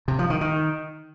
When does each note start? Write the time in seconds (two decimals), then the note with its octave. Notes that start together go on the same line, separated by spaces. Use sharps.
0.08 C3
0.19 F3
0.30 D#3
0.41 D#3